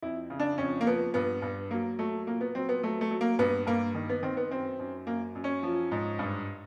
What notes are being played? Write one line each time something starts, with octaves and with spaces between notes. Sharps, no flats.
F2 E4
C#3
D4
F2 C#4
A#3
F3 B3
G2 B3
G2
F#3 A#3
F#3 A3
A#2 A#3
B3
F#3 C4
B3
F#3 A3
A3
F#3
A#3
G2 B3
G2 A#3
D#3
B3
D#3 C4
B3
F#2 C4
F#2
F#2 A#3
F#2
C#4
F3
G#2
G2